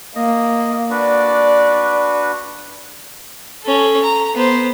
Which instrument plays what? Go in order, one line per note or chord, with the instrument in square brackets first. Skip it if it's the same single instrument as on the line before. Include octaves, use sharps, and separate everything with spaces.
[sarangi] A#3 [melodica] D#5
[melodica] D4 F#4 B4 [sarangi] D5
[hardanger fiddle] C#4 A4
A#5
B3 C5